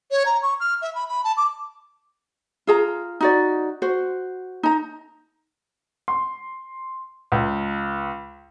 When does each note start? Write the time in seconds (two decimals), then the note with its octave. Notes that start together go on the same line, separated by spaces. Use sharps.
0.11 C#5
0.26 A#5
0.43 C#6
0.60 F6
0.82 E5
0.95 B5
1.08 B5
1.24 A5
1.37 D6
2.67 F4 G#4 A#5
3.21 D#4 F#4 D5
3.82 F#4 C5
4.63 D#4 A#5
6.08 C6
7.32 C#2